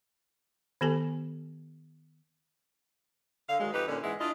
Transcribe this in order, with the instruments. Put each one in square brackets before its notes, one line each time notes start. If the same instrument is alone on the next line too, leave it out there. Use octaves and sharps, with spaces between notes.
[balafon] D#3 B3 G4 A4 G#5
[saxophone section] D3 F5
D#3 F#3 G#3
F2 D#4 G4 B4
A#2 D3 C#4
G#2 E3 G#3 B3 E4
D4 E4 F4 D#5